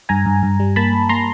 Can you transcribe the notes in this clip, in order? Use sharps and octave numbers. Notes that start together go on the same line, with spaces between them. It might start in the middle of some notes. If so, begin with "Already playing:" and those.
G2 G#5 A#5
G2
G2
G3
A#3 A5 B5
A#3
A#3 A#5 C6